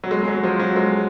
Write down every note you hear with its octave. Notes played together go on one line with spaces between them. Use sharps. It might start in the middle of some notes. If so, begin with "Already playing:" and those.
F#3
G#3
G#3
F#3
F3
F#3
G#3